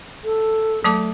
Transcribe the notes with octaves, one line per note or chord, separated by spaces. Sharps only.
A4
F#3 A3 A5 D6